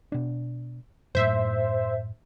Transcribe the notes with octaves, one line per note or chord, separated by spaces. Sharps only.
B2 D4
F#2 A2 C5 E5